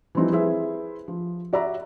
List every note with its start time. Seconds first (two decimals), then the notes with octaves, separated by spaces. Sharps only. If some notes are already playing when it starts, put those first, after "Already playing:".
0.15 E3 F3 G3 C4 D#4 E4
0.32 E4 G#4 B4 C5 E5
1.08 F3
1.53 F#4 D5 E5 A#5